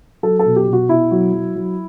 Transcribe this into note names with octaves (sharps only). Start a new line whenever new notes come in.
F#3 A4
A4
B2
G4
B2
F#4
B2 E4
F#3
F#3
F#3